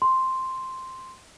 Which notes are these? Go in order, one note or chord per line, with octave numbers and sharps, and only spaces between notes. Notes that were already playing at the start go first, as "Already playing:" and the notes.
C6